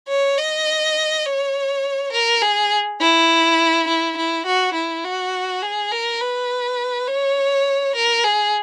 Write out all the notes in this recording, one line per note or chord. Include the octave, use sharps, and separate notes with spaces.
C#5
D#5
C#5
A#4
G#4
E4
E4
E4
F#4
E4
F#4
G#4
A#4
B4
C#5
A#4
G#4